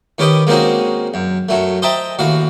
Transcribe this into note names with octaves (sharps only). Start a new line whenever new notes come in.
D#3 C#4 G4 B4 D#5
G#3 A#3 C4 C#4 D#4 F#4
F#2
F#2 F#3 A3
C5 D#5 E5 G5 A5 A#5
A1 D#2 F#4 F5